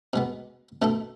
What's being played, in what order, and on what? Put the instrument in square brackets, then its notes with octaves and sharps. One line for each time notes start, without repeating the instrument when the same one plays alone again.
[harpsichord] B2 G#3 B3
B2 A3 E4 A4